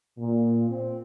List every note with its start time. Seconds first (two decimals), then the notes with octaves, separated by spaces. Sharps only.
0.18 A#2
0.69 C4